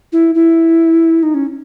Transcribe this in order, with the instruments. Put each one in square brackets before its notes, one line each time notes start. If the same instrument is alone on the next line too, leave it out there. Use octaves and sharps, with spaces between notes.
[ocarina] E4
E4
D#4
C#4